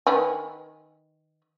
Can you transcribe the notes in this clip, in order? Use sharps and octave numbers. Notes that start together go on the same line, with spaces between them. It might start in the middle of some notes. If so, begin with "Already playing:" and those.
D#3 B4 G#5